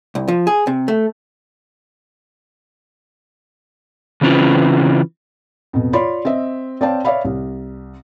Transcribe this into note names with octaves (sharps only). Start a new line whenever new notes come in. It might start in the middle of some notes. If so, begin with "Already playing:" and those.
C2
F3
G#4
C3
A3
C#3 E3 C4 C#4 F4 B4
F2 B2
F4 C#5 D5 B5 C6
C4 D#5 E5
C4 C#5 D5 F5 G5 A5
C#5 D5 E5 F5 B5
C2